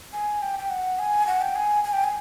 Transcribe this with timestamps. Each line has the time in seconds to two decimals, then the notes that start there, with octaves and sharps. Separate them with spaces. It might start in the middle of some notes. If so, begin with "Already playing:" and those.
0.13 G#5
0.42 G5
0.59 G5
0.70 F#5
0.99 G#5
1.27 F#5
1.41 G5
1.56 G#5
1.84 G#5
1.93 G5
2.04 G#5